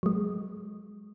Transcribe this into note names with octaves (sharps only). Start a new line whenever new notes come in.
F#3 G#3